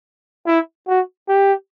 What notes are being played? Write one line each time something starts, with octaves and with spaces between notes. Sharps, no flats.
E4
F#4
G4